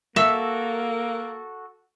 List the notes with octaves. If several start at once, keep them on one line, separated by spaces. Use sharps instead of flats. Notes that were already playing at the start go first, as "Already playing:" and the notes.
A#3 F#4 A4 E5